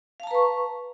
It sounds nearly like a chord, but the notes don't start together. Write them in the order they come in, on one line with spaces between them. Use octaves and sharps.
F5 A5 A#5 B4 C#6